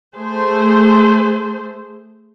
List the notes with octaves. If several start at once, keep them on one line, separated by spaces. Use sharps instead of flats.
A3 G#4 C5